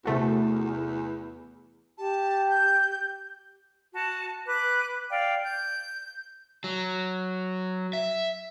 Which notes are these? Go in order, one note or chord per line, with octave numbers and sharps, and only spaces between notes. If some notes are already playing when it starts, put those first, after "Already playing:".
E2 C3 A3 F#4
G4 A5
G6
F#4 A5
B4 D6 F#6
D5 F5 G5
G6
F#3
E5